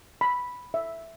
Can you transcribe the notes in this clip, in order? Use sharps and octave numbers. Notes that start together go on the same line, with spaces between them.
B5
E5